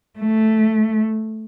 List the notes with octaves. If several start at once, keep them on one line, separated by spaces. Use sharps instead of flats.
A3